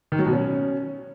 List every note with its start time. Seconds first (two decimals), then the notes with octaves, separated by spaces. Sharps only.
0.12 D#3
0.19 F#3
0.26 B2
0.33 C#4